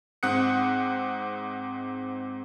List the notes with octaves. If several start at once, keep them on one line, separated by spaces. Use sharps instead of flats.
G#2 C4 F#5 D#6 F#6 C#7